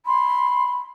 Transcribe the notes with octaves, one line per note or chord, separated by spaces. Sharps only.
B5 C6